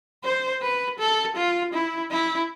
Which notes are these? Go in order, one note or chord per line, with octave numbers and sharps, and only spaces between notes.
C5
B4
A4
F4
E4
E4